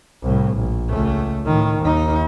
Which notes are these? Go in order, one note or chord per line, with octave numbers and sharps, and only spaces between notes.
C2 A2
A#1
C#2 A3
A2 D#3
D#2 D#4